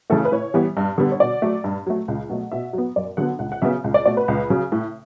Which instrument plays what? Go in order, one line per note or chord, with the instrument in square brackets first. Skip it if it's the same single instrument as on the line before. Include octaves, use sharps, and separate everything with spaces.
[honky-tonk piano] C#3 E3 A3 A4
B4
A2 C#5
E3 G3 B3
G2
D3 G3 B3
C#5
B2 D5
F#3 A3
G2
F#3 A3
C#2
B2 F#3 A3
B2 E5
F#3 B3
F#2 D5
D3 F#3 B3 F#5
C#2 F#5
F#5
C#3 F#3 B3 E5
C#2
D5
B2 A3 D5
B4
C#2
C#3 F#3
A2